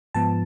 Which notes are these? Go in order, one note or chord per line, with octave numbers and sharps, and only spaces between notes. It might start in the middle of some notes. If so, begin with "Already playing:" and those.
G#2 F3 B3 A5